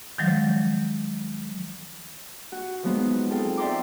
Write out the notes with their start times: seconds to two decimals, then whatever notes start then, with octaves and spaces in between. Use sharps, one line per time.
0.18 D#3 F3 F#3 G#3
2.52 F#4
2.83 F3 F#3 G#3 B3 D#4
3.31 C4 F4 G#4 A4 G5
3.57 D5 E5 G5 A#5 C6 D6